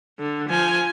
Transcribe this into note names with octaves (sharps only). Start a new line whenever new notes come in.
D3
F3 G#5